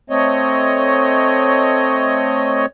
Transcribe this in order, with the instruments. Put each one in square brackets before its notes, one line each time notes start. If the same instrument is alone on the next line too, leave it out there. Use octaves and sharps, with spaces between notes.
[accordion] A3 C4 C#5 D#5